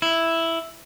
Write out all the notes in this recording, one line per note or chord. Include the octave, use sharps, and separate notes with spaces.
E4